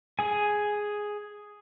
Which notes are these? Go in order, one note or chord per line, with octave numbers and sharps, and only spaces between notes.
G#4 G#5